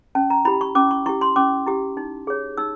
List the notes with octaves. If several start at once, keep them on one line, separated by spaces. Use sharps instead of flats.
C#4 A5
A#5
E4 G4 B5
C#6
C#4 D6
C#6
E4 G4 C#6
C6
C#4 D6
E4 G4
D#4
G#4 C#5
D#4 E6